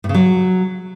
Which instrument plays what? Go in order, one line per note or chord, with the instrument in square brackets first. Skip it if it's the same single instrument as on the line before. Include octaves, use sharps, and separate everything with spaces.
[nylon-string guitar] A2
C#3
F#3